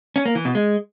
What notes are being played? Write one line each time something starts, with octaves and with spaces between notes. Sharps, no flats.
C#4
A#3
E3
B2
G#3